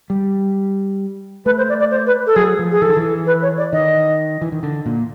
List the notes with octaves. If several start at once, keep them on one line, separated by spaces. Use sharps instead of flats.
G3
A3 B4
C5
D5
D5
C5
B4
A4
F#3 G#4
F3
G#4
E3 A4
D#3
E3
B4
C#5
D5
D#3 D#5
E3
D#3
D3
A#2